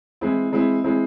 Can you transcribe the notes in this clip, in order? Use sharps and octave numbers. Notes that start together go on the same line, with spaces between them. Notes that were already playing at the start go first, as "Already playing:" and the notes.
E3 G#3 C4 E4
E3 G#3 C4 E4
E3 G#3 C4 E4